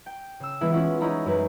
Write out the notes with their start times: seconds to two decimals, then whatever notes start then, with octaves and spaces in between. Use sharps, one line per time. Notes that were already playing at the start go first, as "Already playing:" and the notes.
0.06 G5
0.40 C#3 E6
0.61 E3 G#3 B3 E4
0.72 C#4 E4 F4 F#5
1.00 C#4 D#4 E4 A#5 B5
1.26 F#2 F#3 B4